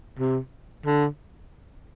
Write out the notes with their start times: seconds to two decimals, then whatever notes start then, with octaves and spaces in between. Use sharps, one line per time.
0.19 C3
0.86 D3